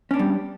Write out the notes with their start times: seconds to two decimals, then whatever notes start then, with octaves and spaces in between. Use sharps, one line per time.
0.11 C#4
0.14 D4
0.16 B3
0.19 G3